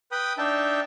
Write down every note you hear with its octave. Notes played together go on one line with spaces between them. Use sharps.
B4 G5 B5 D#6
D4 D#4 E5 G5 A5